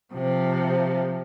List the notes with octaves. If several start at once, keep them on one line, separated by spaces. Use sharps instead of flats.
C3 F3